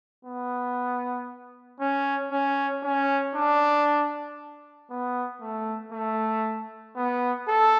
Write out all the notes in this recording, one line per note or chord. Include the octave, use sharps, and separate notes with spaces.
B3
C#4
C#4
C#4
D4
B3
A3
A3
B3
A4